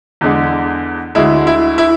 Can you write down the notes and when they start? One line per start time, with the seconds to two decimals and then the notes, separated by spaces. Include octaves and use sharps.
0.21 E2 D3 G#3
1.15 D2 D3 G#3 E4
1.47 E4
1.78 E4